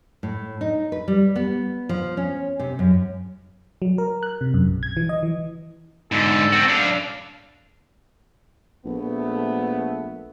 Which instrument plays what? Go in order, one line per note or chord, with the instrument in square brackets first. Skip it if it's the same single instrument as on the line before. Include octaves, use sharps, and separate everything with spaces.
[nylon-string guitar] A2
D#4
B4
G3
B3
F3
C#4
C3
F#2
[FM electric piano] F#3
A#4
F#6
C3
F#2
B1
G#6
E3
D#5
E3
[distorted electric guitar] G#2 D3 [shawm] A4
[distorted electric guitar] C4 F#4
D4 F5
[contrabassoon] A#1 [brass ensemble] A3 B3